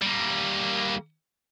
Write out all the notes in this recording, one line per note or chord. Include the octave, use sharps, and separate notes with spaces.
G3 A#3